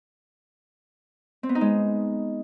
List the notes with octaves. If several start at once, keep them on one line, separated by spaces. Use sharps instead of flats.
C4
B3
D#4
G#3